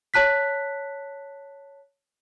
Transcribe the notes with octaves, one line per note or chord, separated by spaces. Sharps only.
C#5 A5 F#6 B6